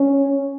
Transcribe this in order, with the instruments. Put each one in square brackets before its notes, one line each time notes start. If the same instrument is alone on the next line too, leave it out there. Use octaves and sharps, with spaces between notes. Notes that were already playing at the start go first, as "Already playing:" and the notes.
Already playing: [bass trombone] C#4